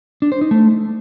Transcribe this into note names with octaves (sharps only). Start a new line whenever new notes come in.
D4
C5
D#4
A3